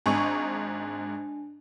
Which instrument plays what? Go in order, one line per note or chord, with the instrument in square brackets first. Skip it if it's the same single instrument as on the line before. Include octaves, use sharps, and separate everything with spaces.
[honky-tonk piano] G#1 G#2 C#6 [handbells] D4 G#5